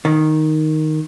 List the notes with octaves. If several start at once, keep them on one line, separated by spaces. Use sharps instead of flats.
D#3